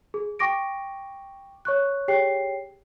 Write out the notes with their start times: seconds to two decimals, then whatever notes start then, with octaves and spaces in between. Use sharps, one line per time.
0.14 G#4
0.39 G5 C#6 D6 A#6 D7
1.65 C#5 C#6 F#6
2.08 G4 G#4 C#5 G5 C7